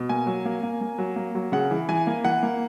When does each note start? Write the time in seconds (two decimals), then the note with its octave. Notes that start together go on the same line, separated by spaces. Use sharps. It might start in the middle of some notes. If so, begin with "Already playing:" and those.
Already playing: B2
0.09 A#3 G#5
0.26 F#3
0.45 A#3
0.63 A#3
0.81 A#3
0.98 F#3
1.16 A#3
1.35 F#3
1.52 C#3 F#5
1.71 E3
1.89 E3 G#5
2.07 A#3
2.24 E3 F#5
2.43 A#3